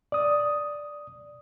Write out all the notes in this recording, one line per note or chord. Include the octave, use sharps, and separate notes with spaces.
D5 D#6